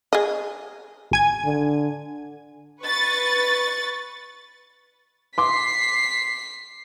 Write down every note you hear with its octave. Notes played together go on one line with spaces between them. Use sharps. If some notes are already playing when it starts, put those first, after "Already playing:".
G#4 D#5
A1 G#5 G#6
D3
B4 C#6 A6
C6 D6 B6 C7